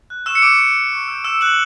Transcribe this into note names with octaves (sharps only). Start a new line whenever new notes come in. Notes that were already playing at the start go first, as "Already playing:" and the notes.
F#6
C#6 E6 E7
C#7
D6 E6 G6 D7
D6
F#6
C#6
E6 G6
D6 E6 E7
F#6 F#7